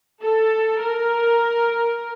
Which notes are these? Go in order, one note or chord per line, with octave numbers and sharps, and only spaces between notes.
A4
A#4